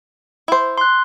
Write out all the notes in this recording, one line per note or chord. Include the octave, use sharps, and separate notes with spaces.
E4 C5
C6 F#6